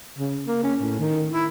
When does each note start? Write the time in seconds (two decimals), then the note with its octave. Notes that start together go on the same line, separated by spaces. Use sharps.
0.19 C#3
0.47 A#3
0.63 C#4
0.81 A2
0.99 D#3
1.33 E4